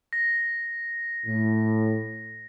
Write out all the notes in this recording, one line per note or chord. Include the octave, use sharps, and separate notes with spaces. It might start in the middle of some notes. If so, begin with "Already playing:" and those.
A#6
A2